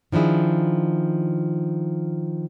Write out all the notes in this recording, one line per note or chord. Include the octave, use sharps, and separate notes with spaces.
D#3 F3 D4 E4 G#4